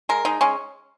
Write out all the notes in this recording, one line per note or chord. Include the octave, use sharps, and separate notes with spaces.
G#3 A#4
G#3 D#4
G#3 C#4